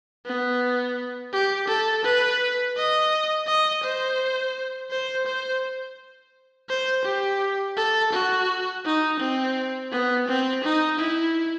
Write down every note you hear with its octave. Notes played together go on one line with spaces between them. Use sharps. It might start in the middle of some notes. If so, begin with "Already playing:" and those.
B3
G4
A4
B4
D#5
D#5
C5
C5
C5
C5
G4
A4
F#4
D#4
C4
B3
C4
D#4
E4